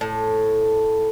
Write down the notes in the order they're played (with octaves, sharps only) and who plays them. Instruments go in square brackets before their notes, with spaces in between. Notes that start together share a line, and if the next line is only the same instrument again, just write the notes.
[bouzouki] A2